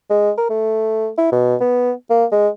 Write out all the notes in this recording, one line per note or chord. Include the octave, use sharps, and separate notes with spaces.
G#3
A#4
A3
E4
B2
B3
A#3
G#3